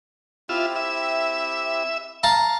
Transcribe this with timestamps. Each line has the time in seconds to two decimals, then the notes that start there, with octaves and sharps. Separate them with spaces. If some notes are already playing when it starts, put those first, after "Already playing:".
0.49 C4 E4 F4 G4 E5
0.76 E5
2.23 F5 A5 A#5